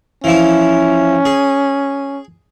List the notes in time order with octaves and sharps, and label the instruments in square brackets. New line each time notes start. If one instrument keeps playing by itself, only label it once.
[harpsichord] E3 F3 E4 [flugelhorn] C#4
[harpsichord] G#4